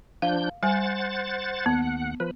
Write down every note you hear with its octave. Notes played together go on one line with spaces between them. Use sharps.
F3 D4 F5 G6
G3 C5 F#5 G#5 A6
D#2 B3 F#5
F3 B4